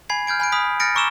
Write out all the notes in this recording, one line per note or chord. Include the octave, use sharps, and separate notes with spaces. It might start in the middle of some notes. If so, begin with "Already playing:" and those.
G#5 B5 G#6 C7
F6 G6 G#6 D7
G#5 B5 F#6 D7
B5 D#6 F6 B6
F6 G6 A6 A#6 C#7 D7
A#5 C#6 D6 E6 E7 G7